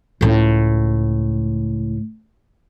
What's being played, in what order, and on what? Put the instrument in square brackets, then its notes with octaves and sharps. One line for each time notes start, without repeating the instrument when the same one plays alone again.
[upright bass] C#2 A2